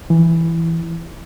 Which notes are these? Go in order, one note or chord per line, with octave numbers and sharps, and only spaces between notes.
E3